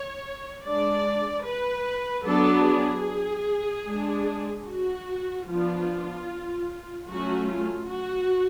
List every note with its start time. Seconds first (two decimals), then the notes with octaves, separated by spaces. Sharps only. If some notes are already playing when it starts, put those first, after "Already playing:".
Already playing: C#5
0.65 G#3 D4 D5
1.46 B4
2.26 F#3 B3 D4 A4
2.67 G#4
3.87 G#3 D4
4.68 F#4
5.48 F3 B3 D4 F4
7.09 F#3 A3 C#4 F#4
7.49 F4
7.89 F#4